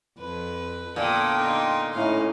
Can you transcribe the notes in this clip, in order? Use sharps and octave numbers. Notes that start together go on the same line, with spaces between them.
F2 B4
A#2 D3 B3 A4 G5 D#6
D#4 F4
A2 C#4 D#4 F5